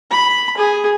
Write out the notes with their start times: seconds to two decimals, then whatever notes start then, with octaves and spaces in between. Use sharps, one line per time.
0.11 B5
0.57 G#4